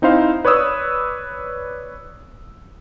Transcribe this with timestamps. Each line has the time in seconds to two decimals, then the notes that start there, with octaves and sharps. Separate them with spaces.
0.02 C4 D#4 E4 C5 F5
0.45 B4 C#5 D5 D#6 E6